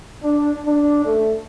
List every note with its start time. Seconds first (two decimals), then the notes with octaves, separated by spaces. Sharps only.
0.23 D4
0.66 D4
1.05 A3